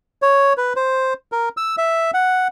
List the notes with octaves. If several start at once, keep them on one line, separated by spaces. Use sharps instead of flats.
C#5
B4
C5
A#4
E6
E5
F#5